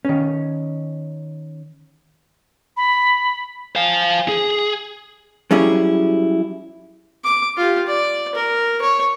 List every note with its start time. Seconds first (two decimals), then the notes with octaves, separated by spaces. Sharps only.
0.05 D#3 C#4
2.76 B5
3.75 C5 F5 G#5
4.28 G#4
5.51 F#3 G3 C#4 E4 G#4
7.24 D6
7.57 F4 G4
7.87 D5
8.35 A#4
8.82 C#5